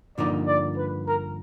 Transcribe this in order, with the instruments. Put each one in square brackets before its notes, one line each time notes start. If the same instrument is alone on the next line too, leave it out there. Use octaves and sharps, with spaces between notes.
[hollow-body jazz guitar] G2 D3 F3 A#3 D#4 [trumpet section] D5
[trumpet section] D5
B4
A#4